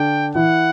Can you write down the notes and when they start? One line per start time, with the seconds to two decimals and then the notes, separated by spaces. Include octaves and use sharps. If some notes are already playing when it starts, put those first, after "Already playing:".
Already playing: D3 D4 G5
0.35 E3 E4 F#5